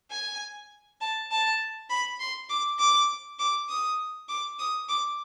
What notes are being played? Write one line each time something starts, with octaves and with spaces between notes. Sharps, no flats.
G#5
A5
A5
B5
C6
D6
D6
D6
D#6
D6
D#6
D6